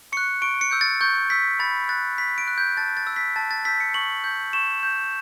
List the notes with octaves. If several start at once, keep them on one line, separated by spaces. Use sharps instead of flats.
C#6 F#6 C#7
C#6 D7
C#7
E6 G6
A6
C#6 G6
E6 G6 B6
B5 A6
F#6 A6
B5 B6
D7
F#6
G6
A5 A6
A6
E6 G6
B6
A5 A6
A6
E6 G6 B6
C#7
C#6 F#7
G6
C#6 E7
G6